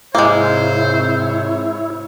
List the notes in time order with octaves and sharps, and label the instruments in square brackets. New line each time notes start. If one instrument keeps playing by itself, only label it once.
[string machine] G#2 C3 C#5 [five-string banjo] G#3 A#3 [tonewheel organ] E4 [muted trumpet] C5